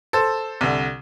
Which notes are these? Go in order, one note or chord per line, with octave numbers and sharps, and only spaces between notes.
A4 C5
C2 D3